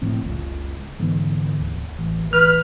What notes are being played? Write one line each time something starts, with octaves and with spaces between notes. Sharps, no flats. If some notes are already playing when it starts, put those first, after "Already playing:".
A2 F3 C4
F#1 C#2
G#2 D3 E3 B3
D2
A1 E3
E3 B4 F6